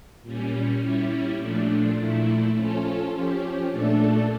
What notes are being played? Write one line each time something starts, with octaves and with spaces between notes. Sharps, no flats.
A#2 G3 C#4
G3 C#4 E4
A#2 F3 A3 D4
A#2 A3 E4
F3 C#4 F4 A4
F3 C#4 G4
A#2 A3 D4 A4